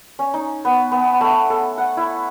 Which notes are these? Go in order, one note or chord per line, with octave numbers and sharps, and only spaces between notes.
C#4
D#4
B3
B3
A3
A4
F#5
E4